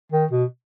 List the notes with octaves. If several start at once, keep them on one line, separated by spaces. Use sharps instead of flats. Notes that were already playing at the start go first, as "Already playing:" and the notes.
D#3
B2